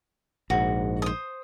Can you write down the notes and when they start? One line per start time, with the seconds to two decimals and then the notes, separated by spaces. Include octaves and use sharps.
0.50 A#1 G#2 F#4
1.02 C5 D#6